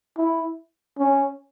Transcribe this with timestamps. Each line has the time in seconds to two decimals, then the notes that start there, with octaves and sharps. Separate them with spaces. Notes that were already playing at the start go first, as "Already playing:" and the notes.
0.18 E4
0.98 C#4